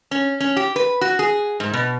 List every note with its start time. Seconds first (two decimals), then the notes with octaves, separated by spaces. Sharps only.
0.11 C#4
0.40 C#4
0.57 G4
0.76 B4
1.01 F#4
1.19 G#4
1.60 G#2
1.73 B2